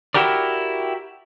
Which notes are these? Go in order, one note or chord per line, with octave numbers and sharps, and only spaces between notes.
E4 F#4 G4 A#4 D5